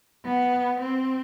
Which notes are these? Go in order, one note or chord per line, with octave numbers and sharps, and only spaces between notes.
B3
C4